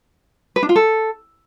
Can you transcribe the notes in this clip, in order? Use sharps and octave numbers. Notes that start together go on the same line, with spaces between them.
B4
D4
F4
A4